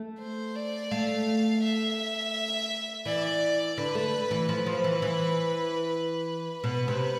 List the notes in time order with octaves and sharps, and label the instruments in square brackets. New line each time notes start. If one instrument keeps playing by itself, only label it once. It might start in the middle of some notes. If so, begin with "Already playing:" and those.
Already playing: [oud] A3
[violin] C5
D5
[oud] A3 [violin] F5
[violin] E5
[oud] E3 [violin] D5
[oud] D3 [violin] B4
[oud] A3
E3
[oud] F3 [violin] B4
[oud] F3
E3
E3
[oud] B2 [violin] B4
[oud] C3